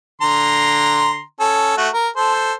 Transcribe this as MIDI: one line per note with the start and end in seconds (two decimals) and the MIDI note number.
0.22 1.21 50
0.22 1.21 82
0.22 1.21 84
1.40 1.73 61
1.40 1.73 69
1.77 1.89 57
1.77 1.89 66
1.94 2.08 70
2.16 2.53 69
2.16 2.53 72